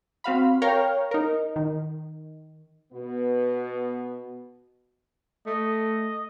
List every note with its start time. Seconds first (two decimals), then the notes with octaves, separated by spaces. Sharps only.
0.24 C4 F#4 F5 B5
0.62 A#4 C#5 F5 G5 A#5 F6
1.11 D#4 A#4
1.56 D#3
2.92 B2 B3
5.46 A3 D#5